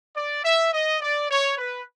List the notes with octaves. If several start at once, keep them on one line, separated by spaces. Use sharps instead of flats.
D5
E5
D#5
D5
C#5
B4